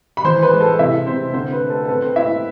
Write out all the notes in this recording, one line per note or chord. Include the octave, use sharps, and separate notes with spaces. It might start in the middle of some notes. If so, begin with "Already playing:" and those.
B5
E3 C5 C6
B4 B5
G#3
A4 A5
C3 E4 E5
C3 C4 C5
D3 C4 C5
B4
A3
A4
A4
C4 B4
C4 C5
C4 E4 E5